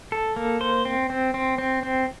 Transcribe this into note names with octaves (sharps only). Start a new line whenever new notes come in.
A4
A#3
C5
C4
C4
C4
C4
C4